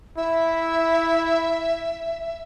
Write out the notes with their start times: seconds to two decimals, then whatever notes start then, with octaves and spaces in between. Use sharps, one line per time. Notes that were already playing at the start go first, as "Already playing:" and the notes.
0.17 E4 E5